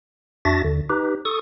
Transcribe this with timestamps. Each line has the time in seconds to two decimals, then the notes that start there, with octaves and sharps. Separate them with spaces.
0.45 F2 D4 F#4 E5 A6 A#6
0.64 D#2 D3
0.90 D#4 G4 B4
1.25 A4 C#6 D#6